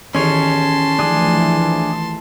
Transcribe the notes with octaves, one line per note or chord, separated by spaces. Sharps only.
A1 E2 D#3 C#4 C#5 A5 C6
E3 F3 A3 D4 G#4